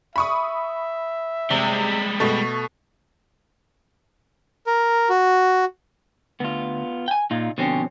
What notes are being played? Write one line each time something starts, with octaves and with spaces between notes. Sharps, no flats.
E5 B5 C#6 D#6
C3 G3 G#3
B2 A3
A#4
F#4
D2 B3 F4
G5 G#5
A#2 D#4 F4
F2 B2 D3 C4 C#4